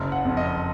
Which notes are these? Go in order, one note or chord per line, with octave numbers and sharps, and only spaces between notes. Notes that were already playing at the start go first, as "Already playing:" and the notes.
Already playing: F#1
F#5
F2
D#5